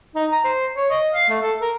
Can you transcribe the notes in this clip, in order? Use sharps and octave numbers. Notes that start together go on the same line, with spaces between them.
D#4
A#5
C5
C#5
D#5
F5
A3
A4
A#4